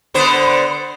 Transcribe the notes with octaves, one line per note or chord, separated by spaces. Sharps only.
D3 B3 C5